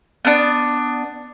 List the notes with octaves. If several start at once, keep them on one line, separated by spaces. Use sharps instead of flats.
B3 D4